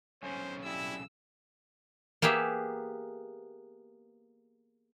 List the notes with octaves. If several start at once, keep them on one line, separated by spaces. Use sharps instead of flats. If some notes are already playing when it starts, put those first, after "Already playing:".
B1 C#3 C#4 C5
G3 E4 E6
A#3 B3 G4 G#4 E5